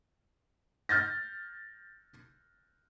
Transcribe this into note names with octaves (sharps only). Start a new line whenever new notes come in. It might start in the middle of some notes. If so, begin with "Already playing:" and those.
F6 G6 A6 A#6